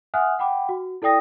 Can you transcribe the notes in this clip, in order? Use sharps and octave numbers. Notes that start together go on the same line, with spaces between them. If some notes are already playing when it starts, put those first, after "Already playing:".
E5 F#5 G#5 D#6 F6 F#6
F#5 G5 B5 D6
F#4
E4 A4 D5 G5 D#6 A#6